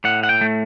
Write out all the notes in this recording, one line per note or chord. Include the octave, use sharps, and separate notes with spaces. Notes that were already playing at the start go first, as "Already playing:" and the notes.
A2 F#5
F#5
G5
A3